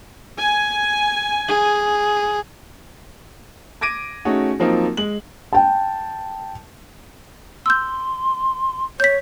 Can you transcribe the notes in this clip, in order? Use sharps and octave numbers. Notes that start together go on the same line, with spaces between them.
G#5
G#4
D6 G#6 A#6 D7 D#7
A3 C#4 D#4 F#4 G#4
F3 F#3 A#3 C4 D#4 F4
G#3 F#7
G5 A5
C6 E6 G6
C#5 G6 B6